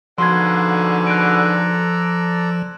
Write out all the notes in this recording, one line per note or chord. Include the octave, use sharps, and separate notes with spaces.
G#2 B2 D3 F3 F5 F#5 C6 G#6
A4 D5 A#5 F#6 D7